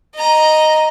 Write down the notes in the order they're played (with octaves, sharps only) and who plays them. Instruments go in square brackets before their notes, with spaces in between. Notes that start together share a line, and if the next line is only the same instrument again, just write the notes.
[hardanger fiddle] D#5 A#5